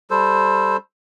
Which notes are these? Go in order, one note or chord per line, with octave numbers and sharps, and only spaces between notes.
G3 A4 C5